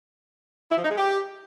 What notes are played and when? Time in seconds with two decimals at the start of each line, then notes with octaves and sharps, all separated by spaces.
0.71 E4
0.77 F3
0.84 D#4
0.90 G#3
0.97 G4